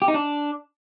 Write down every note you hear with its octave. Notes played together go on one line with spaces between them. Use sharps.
G4
D#4
D4